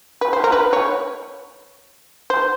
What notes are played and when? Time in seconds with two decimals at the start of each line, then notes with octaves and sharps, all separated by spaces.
0.21 B4
0.33 C5
0.44 A#4
0.52 B4
0.73 C#5
2.30 C5